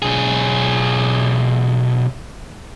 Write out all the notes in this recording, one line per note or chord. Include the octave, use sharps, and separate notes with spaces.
B1 G#4